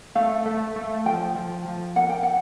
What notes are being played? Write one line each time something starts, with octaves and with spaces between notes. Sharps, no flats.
A3 F5
A3
A3
F3 G5
F3
F3
A#3 F#5
G5
F#5